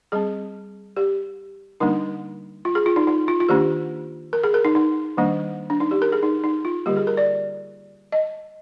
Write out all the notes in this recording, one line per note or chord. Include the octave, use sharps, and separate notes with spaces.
G3 C4 G#4
G4
D3 G3 A#3 D4 D#4
F4
G#4
F4
D#4
D#4
F4
F4
D#3 A#3 D4 G4
A#4
G#4
A#4
D#4
D#4
D#3 G3 A#3 D4
D4
D#4
G4
A#4
G#4
D#4
D#4
F4
D3 G3 A#3 G4
G#4
A#4
D5
D#5